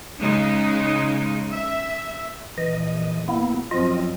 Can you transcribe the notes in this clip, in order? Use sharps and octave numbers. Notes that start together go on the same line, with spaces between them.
C#3 G#3 D#4
E5
A#1 E3 D#5
A#3 B3 E4
F#2 F3 C4 F4 D#5